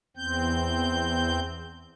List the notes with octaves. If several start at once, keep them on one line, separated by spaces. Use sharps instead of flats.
E2 C4 G6